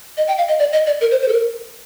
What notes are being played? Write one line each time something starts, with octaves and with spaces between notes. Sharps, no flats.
D#5
G5
F5
D#5
D5
D#5
D5
A#4
C5
C5
A4
A#4